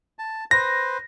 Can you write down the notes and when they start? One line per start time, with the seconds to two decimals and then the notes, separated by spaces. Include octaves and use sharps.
0.19 A5
0.51 B4 C5 A#6